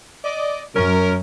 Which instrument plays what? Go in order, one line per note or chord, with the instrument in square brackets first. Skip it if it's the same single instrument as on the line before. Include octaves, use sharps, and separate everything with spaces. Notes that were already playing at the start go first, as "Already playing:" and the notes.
[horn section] D5 D#5
[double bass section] F#2 [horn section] C#4 A#4